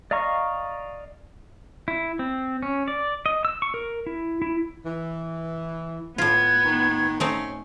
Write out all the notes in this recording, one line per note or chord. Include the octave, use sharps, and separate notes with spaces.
D5 D#5 F5 A#5 C#6
E4
C4
C#4
D5
D#5
E6
C#6
A#4
E4
E4
E3
A2 B3 F4 G#6
D#3
A3 C4 C#4 D#4